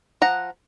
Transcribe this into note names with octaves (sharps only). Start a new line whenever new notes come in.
F3 F#5 A#5